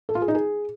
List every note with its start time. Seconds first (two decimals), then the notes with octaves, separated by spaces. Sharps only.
0.09 A4
0.15 F4
0.22 G#4
0.28 D#4
0.35 G#4